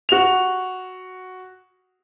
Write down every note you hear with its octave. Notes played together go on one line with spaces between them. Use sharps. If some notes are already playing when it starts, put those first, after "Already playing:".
F#4 F7